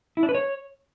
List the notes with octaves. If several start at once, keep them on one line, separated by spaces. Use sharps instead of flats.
E4
D4
B4
C#5